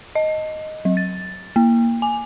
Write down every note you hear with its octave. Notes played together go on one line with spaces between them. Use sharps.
D#5
F#3
A6
A#3
G#5